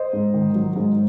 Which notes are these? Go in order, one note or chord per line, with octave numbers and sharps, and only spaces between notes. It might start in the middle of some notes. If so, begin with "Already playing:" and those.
Already playing: C5 D#5
G#2
D#3
F#3
G#2